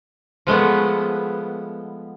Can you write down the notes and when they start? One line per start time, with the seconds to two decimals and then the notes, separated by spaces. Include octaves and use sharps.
0.47 F3 G#3 A3 B3